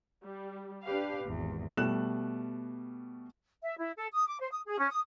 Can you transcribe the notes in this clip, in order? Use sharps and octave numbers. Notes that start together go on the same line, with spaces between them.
G3
D4 G4 B4 F5
G#1 E2
B2 G3 A3 F#6 E7
E5
E4
A4
D#6
D6
C5
D#6
G#4
C#4
D#6